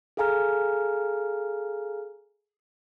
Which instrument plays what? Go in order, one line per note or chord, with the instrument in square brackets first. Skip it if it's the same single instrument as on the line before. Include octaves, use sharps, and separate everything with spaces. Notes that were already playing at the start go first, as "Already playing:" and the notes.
[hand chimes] G#4 A4 F5 G#5 A#5 F6